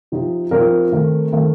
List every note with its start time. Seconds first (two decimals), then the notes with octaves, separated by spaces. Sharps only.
0.12 C3 F3 C4 D#4
0.51 C3 F3 C4 D#4 A#4
0.92 D#3 A3 C4 D#4
1.32 D#3 A3 C4 D#4